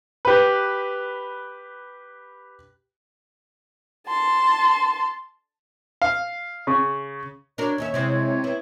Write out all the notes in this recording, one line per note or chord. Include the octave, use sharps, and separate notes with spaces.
G4 B4
A5 C6
F5
C#3
D4 F#4 A#4 C#5
D#2 C#4 E5
C3 G#3 C4 E4
B3 E4